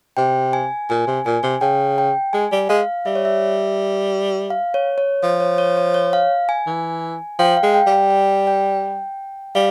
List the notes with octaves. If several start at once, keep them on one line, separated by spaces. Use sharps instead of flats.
C3 G5
G#5
A#2 G#5
C3
A#2 G#5
C3
C#3 G5
G5
G#3 G#5
G3
G#3 F5
G3 E5
C#5
E5
F5
C#5
C#5
F3
C#5
C#5
C#5
C#5
F5
G#5
E3
F3 G5
F5
G#3
G5
G3
G5
G5
G5
G3 F5